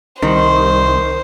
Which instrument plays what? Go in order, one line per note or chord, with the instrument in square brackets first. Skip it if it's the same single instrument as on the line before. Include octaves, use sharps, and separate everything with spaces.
[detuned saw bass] C2 [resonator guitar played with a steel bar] D#3 [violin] C5